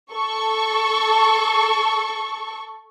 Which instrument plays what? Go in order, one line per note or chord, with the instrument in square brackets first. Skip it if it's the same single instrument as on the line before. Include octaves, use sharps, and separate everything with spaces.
[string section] A4 C#6